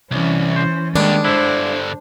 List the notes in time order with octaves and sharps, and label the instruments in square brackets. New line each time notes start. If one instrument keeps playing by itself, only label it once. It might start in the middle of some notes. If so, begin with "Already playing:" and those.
[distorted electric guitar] C2 [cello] E3 C#4
[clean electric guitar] C5
[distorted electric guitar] D#2 D3 [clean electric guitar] D#3 G3 [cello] G#3 [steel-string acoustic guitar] D4
[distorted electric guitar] G2 D3 [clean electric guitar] E4 [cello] C5